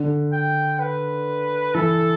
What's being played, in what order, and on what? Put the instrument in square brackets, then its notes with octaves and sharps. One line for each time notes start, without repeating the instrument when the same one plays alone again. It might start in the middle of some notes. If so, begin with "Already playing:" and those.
Already playing: [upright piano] D3
[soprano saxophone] G5
B4
[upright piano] E3 [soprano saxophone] A4